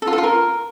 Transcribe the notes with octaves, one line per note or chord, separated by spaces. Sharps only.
A4
F4
A4
F4
A#4